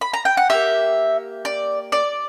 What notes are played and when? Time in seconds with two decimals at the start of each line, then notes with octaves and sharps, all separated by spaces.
0.01 B5
0.13 A#5
0.25 G5
0.37 F#5
0.50 A#3 C#4 G4 E5
1.45 D5
1.92 D5